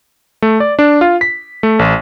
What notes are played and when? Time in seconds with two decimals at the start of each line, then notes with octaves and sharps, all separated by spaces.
0.42 A3
0.60 D5
0.79 D4
1.01 F4
1.21 B6
1.63 A3
1.79 A1